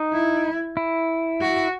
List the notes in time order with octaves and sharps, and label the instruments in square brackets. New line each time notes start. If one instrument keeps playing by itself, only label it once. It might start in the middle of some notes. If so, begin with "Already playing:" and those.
Already playing: [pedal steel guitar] D#4
[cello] E4
[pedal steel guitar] E4
[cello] F#4